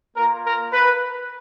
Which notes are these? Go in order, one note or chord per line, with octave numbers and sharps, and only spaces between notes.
A#3 F4 A#4
A#4
B4